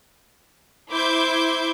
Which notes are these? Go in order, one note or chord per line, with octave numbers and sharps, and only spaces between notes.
E4 C5 D6 G6 G#6 D7